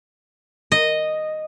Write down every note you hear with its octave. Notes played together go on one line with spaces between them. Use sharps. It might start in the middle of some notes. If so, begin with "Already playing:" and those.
D#5